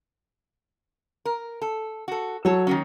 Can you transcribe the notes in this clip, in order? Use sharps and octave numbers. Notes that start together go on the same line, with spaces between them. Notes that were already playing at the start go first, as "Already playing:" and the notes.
A#4
A4
F#4 A4
F#3 A4 C#5 A5
D#3 A#3 C#4